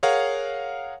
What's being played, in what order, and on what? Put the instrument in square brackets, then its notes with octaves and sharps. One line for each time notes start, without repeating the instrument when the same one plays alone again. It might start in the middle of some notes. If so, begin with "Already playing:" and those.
[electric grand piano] G#4 A#4 C#5 F5 F#5